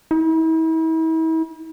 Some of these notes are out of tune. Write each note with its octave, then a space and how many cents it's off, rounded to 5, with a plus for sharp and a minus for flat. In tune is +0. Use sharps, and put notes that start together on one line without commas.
E4 -40